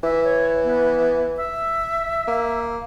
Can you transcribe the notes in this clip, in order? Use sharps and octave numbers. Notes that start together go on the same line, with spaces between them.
E3 E5
C#5
B3
E5
A#3